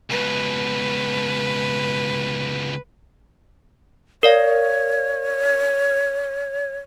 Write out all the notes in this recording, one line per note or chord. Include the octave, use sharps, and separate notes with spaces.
C#2 B2 B4
A#4 C#5 D5 F5